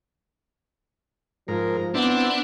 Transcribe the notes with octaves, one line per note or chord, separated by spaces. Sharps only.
G#2 F3 A#4
B3 C4 D4 E4